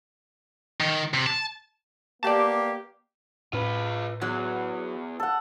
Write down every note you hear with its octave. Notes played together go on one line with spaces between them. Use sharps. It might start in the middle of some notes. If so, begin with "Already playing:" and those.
D#3
C3
A5
A#3 B3 G4 D5 A5
A2 C#4 F4 B4
E2 F#3
A4 F#5